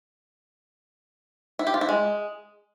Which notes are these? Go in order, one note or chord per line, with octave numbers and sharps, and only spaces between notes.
E4
G4
F4
E4
G#3